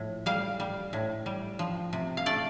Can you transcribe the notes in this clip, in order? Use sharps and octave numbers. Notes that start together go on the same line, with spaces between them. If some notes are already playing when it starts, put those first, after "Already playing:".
Already playing: A2 F3
G3 F5
G3
A2
G3
F3
C3
F5
A3 D5